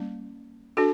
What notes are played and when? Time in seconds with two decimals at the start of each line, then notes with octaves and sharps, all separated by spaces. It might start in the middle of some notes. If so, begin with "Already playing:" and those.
Already playing: G3 A#3 C#4
0.77 D4 F#4 A4